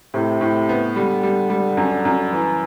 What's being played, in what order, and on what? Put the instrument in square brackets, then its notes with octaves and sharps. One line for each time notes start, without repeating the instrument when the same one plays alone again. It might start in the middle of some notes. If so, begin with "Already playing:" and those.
[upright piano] A2 [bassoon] C3
[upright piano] A2
B3
[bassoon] D3 [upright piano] G3
[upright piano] G3
G3
F#2
F#2
E3